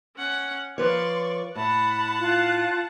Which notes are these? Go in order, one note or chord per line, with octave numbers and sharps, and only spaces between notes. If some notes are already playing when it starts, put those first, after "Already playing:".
C#4 F#5
F3 B4 C#5 D5 C6 C#6
A2 F#5 A5 B5
F4 F#6